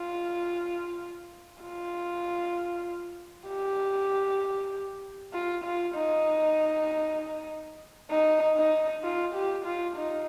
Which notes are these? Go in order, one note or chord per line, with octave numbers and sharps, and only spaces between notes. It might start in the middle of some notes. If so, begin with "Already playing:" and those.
Already playing: F4
F4
G4
F4
F4
D#4
D#4
D#4
F4
G4
F4
D#4